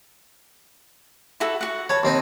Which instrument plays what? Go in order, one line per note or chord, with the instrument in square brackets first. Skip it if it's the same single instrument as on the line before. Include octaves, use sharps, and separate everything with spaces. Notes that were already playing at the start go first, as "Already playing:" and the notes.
[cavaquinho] E4 F#4 A4
F#4 F#5
[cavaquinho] B4 A5 [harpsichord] C#5
[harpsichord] D#2 C4 D#4